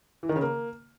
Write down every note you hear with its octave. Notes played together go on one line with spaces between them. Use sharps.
E3
D#3
C#3
A#3